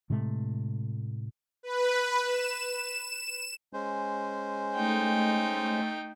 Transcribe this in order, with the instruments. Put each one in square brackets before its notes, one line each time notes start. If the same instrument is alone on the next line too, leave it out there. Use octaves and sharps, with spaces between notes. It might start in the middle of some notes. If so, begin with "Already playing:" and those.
[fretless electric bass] A2 C3 G#3 A3
[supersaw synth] B4
E7
[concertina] G#3 C#4 C5
[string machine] A3 [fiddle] D#4 G5